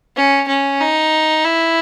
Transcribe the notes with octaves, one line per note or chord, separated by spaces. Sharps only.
C#4
C#4
D#4
E4